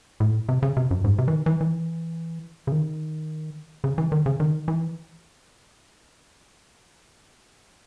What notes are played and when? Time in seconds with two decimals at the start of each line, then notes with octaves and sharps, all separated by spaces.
0.20 A2
0.49 C3
0.63 C#3
0.77 C3
0.91 F#2
1.04 G#2
1.19 C3
1.28 E3
1.33 D#3
1.46 E3
1.61 E3
2.67 C#3
2.72 D#3
3.84 C#3
3.98 E3
4.12 D#3
4.26 C#3
4.40 D#3
4.68 E3